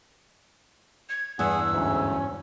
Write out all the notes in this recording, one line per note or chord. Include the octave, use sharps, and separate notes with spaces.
G#6
E2 G2 G#4 F#5 E6
D2 G#2 C#4